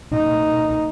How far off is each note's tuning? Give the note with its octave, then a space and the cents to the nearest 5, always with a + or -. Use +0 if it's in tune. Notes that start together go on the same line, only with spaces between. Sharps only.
A#3 -45 D#4 +0